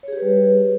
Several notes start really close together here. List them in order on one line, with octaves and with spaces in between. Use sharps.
C#5 G#4 G4 B4 G3